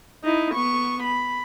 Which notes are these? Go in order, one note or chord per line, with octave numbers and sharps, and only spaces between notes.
D#4 E4
B3 C#6
B5